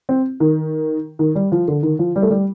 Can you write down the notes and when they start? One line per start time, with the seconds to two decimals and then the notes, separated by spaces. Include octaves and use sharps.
0.09 C4
0.40 D#3
1.19 D#3
1.35 G3
1.52 F3
1.68 D3
1.83 D#3
1.99 F3
2.16 G3
2.22 A3
2.30 G3